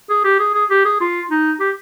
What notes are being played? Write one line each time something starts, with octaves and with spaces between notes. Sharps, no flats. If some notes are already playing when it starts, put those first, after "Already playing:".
G#4
G4
G#4
G#4
G4
G#4
F4
D#4
G4